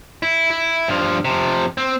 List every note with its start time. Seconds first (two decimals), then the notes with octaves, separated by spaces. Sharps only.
0.23 E4
0.50 E4
0.88 G2 F3
1.25 C3 F3
1.78 C4